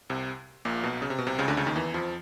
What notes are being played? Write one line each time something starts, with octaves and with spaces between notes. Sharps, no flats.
C2 C3
A#1 A#2
B1 B2
C#3
C3
B2
C2 C3
C#2 C#3
D2 D3
C#2 C#3
D#2 D#3
E2 E3
F2 F3